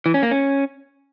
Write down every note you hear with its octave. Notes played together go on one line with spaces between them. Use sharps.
E3
C#4
A#3
C#4